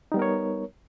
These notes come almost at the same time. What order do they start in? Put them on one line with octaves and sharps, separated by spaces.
D#4 G3 B3 A#4 C#5